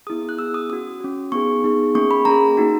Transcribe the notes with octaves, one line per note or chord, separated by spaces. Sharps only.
B3 E4 G#4 D#6
F#6
B3 E4 G#4 E6
D#6
C#4 F#4 D#6
C#4 F#4
B3 D#4 G#4 C#6
B3 D#4 G#4
A#3 C#4 G#4 C#6
B5
A#3 C#4 G#4 A#5
A#3 D#4 F#4